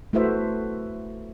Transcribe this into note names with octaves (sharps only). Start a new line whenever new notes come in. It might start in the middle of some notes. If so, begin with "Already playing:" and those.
A3 E4 F#4 B4 C5 E5